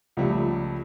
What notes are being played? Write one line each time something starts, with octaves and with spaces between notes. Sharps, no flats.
C#2 F3 G3 A3